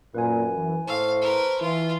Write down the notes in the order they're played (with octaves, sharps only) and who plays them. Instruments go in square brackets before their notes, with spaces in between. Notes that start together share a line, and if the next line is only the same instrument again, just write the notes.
[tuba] F#2 [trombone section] A#2 [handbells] B4 G#5
[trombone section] E3
[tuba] A2 [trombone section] C5 [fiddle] F5 [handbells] A5 C#6 E6
[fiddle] A#4 B4
[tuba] E3 [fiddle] F4